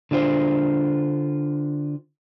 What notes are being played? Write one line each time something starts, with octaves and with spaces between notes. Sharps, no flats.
D3 D4 F4 C5